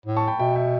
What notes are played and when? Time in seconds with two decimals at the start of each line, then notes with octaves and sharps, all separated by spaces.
0.06 A2
0.17 A5 C#6
0.28 G5 B5
0.39 B2 E5 G5
0.56 E5 G5